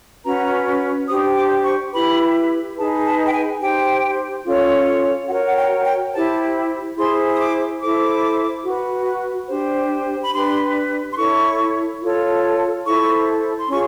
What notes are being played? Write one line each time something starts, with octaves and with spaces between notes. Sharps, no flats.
C#4 F#4 B4 A#5
D4 G4 C5 D#6
D6
C#6
E4 G4 B4 B5
D#4 G#4 B4 A5
A5
G5
G#5
D#4 G4 C5 G5
C#4 F4 A4 C#5
F#4 A#4 C#5 F#5
F#5
G5
G5
E4 G4 C5 A5
E4 G#4 C5 C6
D#6
D6
E4 A4 C5 D6
F#4 B4
D4 G4 C5
B5
D4 G4 B4 C6
C6
E4 A4 C#5 C#6
F4 A4 C#5
E4 A4 C5 C#6
C6
C#4 F4 G#4 C#6